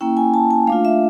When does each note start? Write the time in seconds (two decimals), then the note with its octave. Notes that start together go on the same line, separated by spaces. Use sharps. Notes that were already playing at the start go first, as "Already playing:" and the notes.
0.01 A#3 C#4 E4 G5
0.17 G#5
0.34 A5
0.51 G#5
0.67 A3 D4 F4 F5
0.85 E5